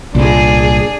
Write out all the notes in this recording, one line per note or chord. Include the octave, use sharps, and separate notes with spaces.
C2 A#2 D4 G#4